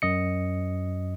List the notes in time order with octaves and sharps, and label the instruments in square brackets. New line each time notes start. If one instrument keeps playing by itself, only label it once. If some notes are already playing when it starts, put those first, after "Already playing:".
[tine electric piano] F#2 D#5 C#7